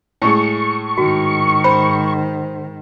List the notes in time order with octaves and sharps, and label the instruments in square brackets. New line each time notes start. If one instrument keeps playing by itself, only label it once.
[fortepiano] A2 G#3 [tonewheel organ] C#6
[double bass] G#2 D#3 [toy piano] F#4
[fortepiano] C5 [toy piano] B5